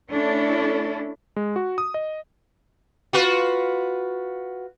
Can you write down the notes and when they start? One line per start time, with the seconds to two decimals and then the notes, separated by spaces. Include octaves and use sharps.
0.10 A3 C#4 D4 E4 A4
1.36 G#3
1.56 F#4
1.78 D#6
1.94 D#5
3.13 F4 F#4 B4